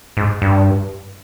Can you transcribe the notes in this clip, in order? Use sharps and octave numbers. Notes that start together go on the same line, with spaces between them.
G#2
G2